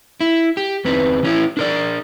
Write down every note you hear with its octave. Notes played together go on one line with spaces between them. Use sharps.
E4
G4
E2 C4 B4
E3 C#4 E4
D4 A#4 D5